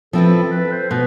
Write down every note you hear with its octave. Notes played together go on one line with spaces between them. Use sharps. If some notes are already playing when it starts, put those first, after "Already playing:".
F3 C4 E4 A4 B4
B4
C5
B2 B4